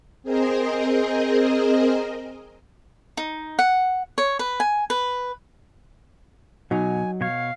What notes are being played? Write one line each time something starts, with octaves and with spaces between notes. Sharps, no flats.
C4 G#4 A#4 C5 D#5
D#4
F#5
C#5
B4
G#5
B4
B2 F#3 D#4 G#5
B2 C#5 F5